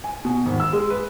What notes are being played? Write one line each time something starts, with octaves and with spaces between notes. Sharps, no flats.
G#5
B2
G#1
E6
G#3
B4